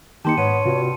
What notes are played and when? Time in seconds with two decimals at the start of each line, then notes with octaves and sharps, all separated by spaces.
0.25 D#3 A#3 D#4 G4 A5 C6 C#7
0.37 G#2 B3 C#5 D#7
0.65 G2 C3 F4 F#4